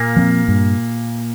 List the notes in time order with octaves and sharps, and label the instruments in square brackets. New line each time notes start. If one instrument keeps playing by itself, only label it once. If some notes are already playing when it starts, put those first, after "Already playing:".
Already playing: [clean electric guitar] A#2 A#3
[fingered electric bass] F3 C4
G2